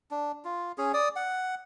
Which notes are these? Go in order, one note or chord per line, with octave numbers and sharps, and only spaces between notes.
D4
F4
C#4 G#4
D5 D#6
F#5